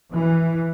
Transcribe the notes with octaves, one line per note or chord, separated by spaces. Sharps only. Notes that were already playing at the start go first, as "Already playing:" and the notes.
E3